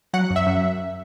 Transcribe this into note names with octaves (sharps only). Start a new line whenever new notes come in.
F#3 F#5
F#2
E5
F#2